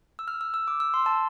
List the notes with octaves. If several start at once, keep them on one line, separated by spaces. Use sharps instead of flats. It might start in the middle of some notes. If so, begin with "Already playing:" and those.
E6
F6
E6
E6
D6
E6
C6
A5